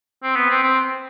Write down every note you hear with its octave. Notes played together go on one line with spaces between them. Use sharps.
C4
B3
C4
C4